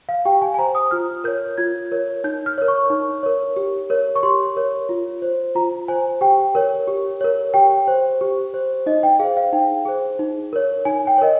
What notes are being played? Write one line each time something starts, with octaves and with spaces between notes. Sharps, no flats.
F5
G4 G5
G#5
G#5
C5 A#5
D#6
F4 F6
A#4 C#5 G6
F4 G#6
A#4 C#5
D#4 G6
F6
A#4 C#5
C#6
D#4
A#4 C#5
G4
A#4 C#5
C#6
G4 C6
A#4 C#5
F4
C5
F4 A#5
C5 G#5
G4 G5
A#4 C#5
G4
A#4 C#5
G4 G5
C5
G4
C5
D#4 D#5
G5
G#4 C5 F5
F5
D#4 G5
G#4 C5
D#4
A#4 C#5
D#4 G#5
G5
A#4 C#5 D#5